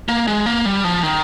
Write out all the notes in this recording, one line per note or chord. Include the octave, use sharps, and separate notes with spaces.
A#3
G#3
A#3
G3
F3
D#3